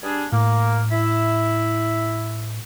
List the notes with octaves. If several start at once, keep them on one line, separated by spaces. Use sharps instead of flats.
G3 D4 G#4
A2 A#3
E4 E5